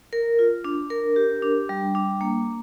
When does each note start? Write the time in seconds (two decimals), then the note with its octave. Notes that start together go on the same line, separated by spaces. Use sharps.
0.13 A#4
0.39 F4
0.64 D4
0.90 A#4
1.16 G4
1.43 D4
1.69 G3
1.95 D4
2.21 A#3